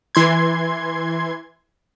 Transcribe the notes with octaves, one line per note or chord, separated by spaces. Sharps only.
E3 C6 G#6